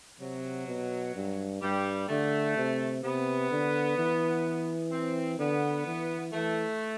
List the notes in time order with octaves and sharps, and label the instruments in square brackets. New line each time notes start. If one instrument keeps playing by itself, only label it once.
[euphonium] C3 [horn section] F#3
[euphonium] B2
G2
[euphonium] G2 [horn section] G3
[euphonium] D3 [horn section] A3
[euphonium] C3
[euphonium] C3 [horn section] B3
[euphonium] D3
E3
[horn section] C4
[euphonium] D3 [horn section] B3
[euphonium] E3
[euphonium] E3 [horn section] A3